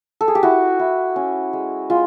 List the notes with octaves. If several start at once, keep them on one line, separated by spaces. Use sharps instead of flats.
A4
G#4
G4
E4 F#4
E4
C#4
G#3
G#3 F4